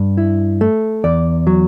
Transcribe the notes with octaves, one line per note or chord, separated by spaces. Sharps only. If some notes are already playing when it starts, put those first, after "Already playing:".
Already playing: G2
E4
A3
E2 D5
F#3